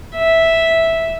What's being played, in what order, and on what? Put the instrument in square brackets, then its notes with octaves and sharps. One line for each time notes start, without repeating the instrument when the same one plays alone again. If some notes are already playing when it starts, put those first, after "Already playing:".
[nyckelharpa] E5